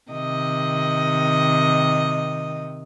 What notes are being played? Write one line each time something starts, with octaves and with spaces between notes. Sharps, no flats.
C3 D#3 D#5